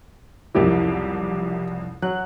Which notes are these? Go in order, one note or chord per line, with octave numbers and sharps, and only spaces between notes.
F#1 C2 F2 E4 G4 A#4
F#3 F#6